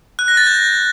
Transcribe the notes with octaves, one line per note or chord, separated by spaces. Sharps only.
F#6
A#6
A6
G6